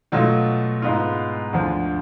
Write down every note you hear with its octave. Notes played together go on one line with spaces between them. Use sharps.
B2 F#3 A3 F4
G#2 G#3 B3 F4
D2 D3 F3